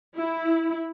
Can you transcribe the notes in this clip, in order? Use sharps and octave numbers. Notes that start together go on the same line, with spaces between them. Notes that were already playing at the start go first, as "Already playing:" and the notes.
E4